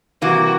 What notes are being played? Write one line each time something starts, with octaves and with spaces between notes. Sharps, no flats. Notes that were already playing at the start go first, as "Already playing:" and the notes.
C3 E3 G3 A#3 F#4